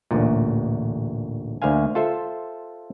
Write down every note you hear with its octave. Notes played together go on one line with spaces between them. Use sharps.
A1 D2 A#2
D2 A#3 C5 F5 G#5
F4 A4 C5 E5